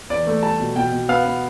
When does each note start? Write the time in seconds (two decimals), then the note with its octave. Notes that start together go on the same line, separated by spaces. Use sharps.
0.10 E2 D5
0.27 A3
0.42 G3 A5
0.59 B2
0.75 B2 G5
0.92 B2
1.09 B3 F5
1.25 B3